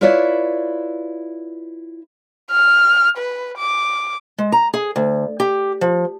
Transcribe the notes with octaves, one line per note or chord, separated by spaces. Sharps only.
E4 F4 B4 C#5 D5 E5
F6
B4
D6
G#3
A#5
G#4
D2
G4
F3